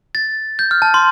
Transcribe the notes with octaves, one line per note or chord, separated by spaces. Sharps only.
A6
G6
F6
A5
C6